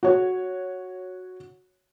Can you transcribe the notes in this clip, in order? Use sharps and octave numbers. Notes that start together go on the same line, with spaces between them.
F#4 C#5